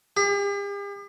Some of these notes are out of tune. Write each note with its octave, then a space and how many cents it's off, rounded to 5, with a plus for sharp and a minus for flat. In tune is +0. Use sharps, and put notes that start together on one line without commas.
G4 +45